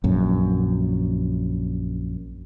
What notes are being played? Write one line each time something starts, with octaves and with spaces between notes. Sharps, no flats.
A#1 F#2